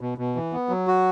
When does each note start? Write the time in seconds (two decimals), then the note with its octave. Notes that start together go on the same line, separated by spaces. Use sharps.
0.01 B2
0.18 B2
0.35 E3
0.52 B3
0.69 F#3
0.87 F#4